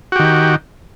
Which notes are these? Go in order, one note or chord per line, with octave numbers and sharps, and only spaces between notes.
D#3 F#4 G4